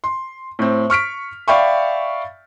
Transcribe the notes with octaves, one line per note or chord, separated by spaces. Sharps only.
C6
A2 C4
C#6 F6 B6 D7
D5 E5 F5 G5 B5 C#6